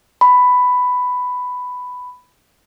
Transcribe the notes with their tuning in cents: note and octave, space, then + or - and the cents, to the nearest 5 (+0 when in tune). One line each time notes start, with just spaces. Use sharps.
B5 +10